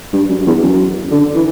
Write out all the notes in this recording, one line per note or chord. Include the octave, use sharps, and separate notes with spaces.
G2
F#2
E2
F#2
D3
E3